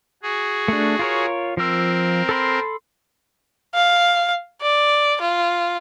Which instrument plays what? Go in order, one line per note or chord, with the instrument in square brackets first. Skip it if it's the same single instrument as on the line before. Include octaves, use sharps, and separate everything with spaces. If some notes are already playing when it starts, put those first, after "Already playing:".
[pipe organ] F#4 G#4
[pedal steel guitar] A3 D4
F4 A#4 C#5
[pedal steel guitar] F3 E6 [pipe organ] C4 A#4
[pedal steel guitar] A4 B5 C6
[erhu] F5
D5
F4